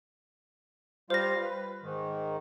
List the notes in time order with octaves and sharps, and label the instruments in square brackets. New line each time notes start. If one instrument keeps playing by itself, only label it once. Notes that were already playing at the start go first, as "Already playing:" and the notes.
[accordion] G3 F4 F5 [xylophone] C5 A#6
[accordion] B4
G#2 D#3